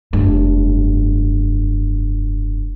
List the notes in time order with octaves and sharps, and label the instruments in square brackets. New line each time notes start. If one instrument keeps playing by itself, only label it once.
[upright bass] F1 G2